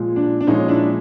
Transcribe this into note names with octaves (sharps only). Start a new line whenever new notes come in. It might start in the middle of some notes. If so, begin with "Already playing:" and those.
Already playing: A#2 F3 G#3
D4
D4
A#2 F3 G#3 C#4 D#4
D4 E4